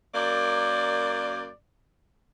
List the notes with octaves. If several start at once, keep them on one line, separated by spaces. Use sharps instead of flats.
F#2 A#3 D5